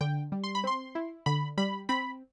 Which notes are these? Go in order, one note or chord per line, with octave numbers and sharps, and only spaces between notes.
D3 G5
G3
C6
B5
C4 C6
E4
D3 B5
G3 B5
C4 B5